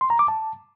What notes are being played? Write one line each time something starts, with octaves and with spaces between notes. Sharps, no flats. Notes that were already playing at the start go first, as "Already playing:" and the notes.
C6
A#5
D6
A5